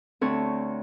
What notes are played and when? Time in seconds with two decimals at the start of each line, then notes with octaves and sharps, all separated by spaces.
0.21 D2 C4 A4 C#5